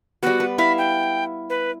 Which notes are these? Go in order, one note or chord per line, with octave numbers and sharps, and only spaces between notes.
G3 B3 F#4
B4
E4 E5 F5 B5
G5
B4